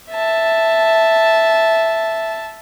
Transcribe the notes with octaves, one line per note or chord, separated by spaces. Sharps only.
E5 A5